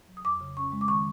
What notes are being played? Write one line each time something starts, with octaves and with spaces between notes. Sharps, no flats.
F#3
D#6
F2 D6
C#3
C#4 C#6
G#3
D6
D#3 C#6